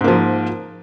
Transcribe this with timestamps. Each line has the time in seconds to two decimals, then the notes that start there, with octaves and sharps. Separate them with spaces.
0.01 G#2
0.04 A#3
0.08 F3